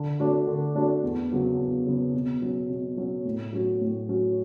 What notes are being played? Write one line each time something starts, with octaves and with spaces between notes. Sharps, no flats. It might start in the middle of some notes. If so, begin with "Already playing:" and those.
Already playing: D3
A3 D4 F#4
D3
A3 D4 F#4
E2
C#3 F#3 B3
E2
C#3 F#3 B3
B2
F#3 C#4
B2
F#3 C#4
A2
F#3 C#4 F#4
A2
F#3 C#4 F#4